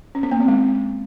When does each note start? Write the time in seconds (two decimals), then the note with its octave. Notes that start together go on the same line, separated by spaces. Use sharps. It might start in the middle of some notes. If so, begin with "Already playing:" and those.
0.15 C#4
0.23 B3
0.32 A#3
0.40 C4
0.48 G#3